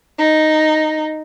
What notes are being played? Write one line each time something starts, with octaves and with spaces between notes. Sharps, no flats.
D#4